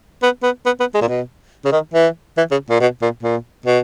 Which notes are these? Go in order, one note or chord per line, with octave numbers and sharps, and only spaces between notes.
B3
B3
B3
B3
G#3
A#2
B2
C#3
D#3
E3
E3
C#3
A#2
B2
A#2
A#2
B2